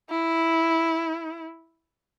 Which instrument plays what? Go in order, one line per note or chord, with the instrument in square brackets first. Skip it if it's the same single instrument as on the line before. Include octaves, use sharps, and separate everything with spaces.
[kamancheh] E4